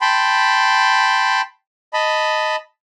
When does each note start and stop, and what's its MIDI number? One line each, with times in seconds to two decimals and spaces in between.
0.01 1.41 79
0.01 1.41 81
0.01 1.41 83
0.01 1.41 84
1.93 2.56 75
1.93 2.56 81
1.93 2.56 83